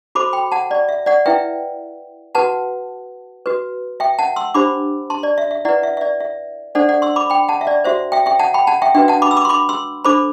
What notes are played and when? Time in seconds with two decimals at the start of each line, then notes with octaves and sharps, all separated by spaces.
0.15 F#4 A4 C5 B5 D6
0.33 G5 B5
0.52 F#5 A5
0.71 D5
0.89 E5
1.06 D5 F#5
1.26 E4 B4 E5 G5
2.35 F#4 B4 F#5 A5
3.46 F#4 B4
4.00 E5 G5
4.19 F#5 A5
4.36 C6 E6
4.54 D4 G4 C5 B5 D6
5.10 A5 C6
5.23 D5
5.38 E5
5.51 E5
5.65 E4 B4 D5 F#5
5.83 E5
5.97 E5
6.01 D5
6.20 E5
6.75 D4 A4 C5 D5 F#5
6.89 D5 F#5
7.02 C6 E6
7.16 B5 D6
7.30 G5 B5
7.48 F#5 A5
7.61 E5
7.67 D5
7.84 F#4 C5 E5
8.12 E5 G5
8.26 E5 G5
8.39 F#5 A5
8.54 G5 B5
8.67 F#5 A5
8.82 E5 G5
8.95 D4 F#4 B4 E5 G5
9.08 F#5 A5
9.22 B5 D6
9.31 E6
9.37 B5 D6
9.45 C6
9.49 B5 D6
9.69 C6 E6
10.04 D4 A4 C5 B5 D6